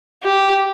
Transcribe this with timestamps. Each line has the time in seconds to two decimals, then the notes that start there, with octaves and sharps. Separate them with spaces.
0.23 G4